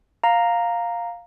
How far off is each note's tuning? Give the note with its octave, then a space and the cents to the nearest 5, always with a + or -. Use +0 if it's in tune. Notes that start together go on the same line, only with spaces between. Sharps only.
F5 +5 A#5 +0